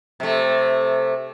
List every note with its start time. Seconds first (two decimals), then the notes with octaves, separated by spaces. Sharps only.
0.20 C3 A3